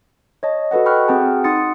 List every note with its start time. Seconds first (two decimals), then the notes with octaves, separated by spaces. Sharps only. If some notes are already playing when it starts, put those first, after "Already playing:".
0.43 C#5 D#5 A5
0.71 F#4 A4 B4 D#5 F#5
0.86 G5 B5 C#6 F6 F#6
1.08 C4 F#4 G#4 F#5 G5 A5
1.44 D#4 F#5 C6 D#6 A6 C#7